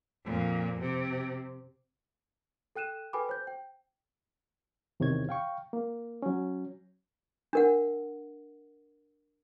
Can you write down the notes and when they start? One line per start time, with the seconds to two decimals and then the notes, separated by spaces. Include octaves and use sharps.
0.25 F2 A#2
0.80 C3
2.76 A4 G5 F#6 D#7 E7
3.13 A4 B4 G5 G#5 B5 D6
3.29 C5 G6
3.47 G5
5.00 E2 C3 D#3 C#5 G#6
5.29 F5 G5 C#6
5.73 A#3
6.22 F#3 C#4
7.53 D4 A#4 F#5